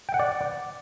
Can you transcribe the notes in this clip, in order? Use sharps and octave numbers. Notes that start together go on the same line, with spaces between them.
G5
F#5
D5